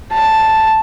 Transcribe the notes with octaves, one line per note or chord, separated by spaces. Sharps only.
A5